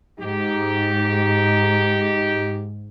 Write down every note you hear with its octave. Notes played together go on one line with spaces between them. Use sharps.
G#2 D#4 G4